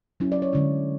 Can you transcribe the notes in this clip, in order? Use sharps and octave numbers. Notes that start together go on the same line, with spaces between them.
F#3 C#4 E4
D5
C#5
D3 G#3 C#4 E4